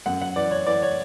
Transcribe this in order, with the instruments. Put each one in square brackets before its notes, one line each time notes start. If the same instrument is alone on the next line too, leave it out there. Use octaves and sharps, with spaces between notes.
[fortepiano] F#2 F#5
F#5
E3 D5
C#5
E3 D5
C#5